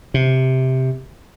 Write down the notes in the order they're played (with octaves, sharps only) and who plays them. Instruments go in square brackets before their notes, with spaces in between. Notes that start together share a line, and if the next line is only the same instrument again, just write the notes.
[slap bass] C3